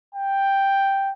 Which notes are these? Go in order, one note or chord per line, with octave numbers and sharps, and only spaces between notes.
G5